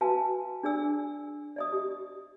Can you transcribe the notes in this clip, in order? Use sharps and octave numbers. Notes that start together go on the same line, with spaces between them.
F#4 B4 F5 G#5 A5
D4 G#4 D5 G#5 E6
D5 D#5 D#6
G4